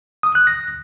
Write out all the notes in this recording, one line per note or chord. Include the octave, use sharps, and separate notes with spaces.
D#6
F#6
A#6